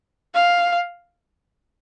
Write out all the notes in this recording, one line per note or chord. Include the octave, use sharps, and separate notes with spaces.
F5